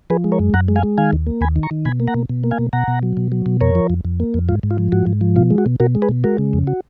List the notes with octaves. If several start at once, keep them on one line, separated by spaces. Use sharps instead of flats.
F3 G#4 B4
G#3
A#4 C#5
F#2
F#2 F#5 A#5
G#3
F5 G#5
G#3
D#3 F5 G#5
D#2
A#3
D#2 G#5 B5
D#3
A#5 C#6
D#3
B2 G#5 B5
A#3
F#5 A#5
B2
B2
A#3
F5 G#5
B2
B2 F#5 A#5
B2
F#3
B2
F#3
B2
F2 A#4 C#5
F3
F2
F2
A#3
F2
G#2 F4
G#2
F4
F3
G#2 F#4
G#2
F3
B2 F4
G#3
F#4
B2
B2 F#4 A#4
G#3
G#4 B4
B2
G#3 F#4 A#4
C#3
F2
F#4